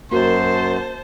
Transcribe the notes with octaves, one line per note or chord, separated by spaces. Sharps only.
F#2 A#3 F#4 A#4 C5 A5 C6